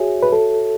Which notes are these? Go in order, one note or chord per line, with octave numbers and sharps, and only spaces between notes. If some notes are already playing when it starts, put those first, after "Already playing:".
Already playing: F#4 G#4 C#5 E5
B4
A4